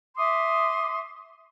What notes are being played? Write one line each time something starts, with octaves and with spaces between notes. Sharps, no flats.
E5 C6 D6 D#6